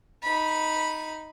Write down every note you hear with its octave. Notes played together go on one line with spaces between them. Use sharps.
D#4 B5